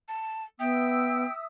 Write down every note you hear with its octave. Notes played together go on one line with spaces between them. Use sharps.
A5
B3 E5 G5 D#6 E6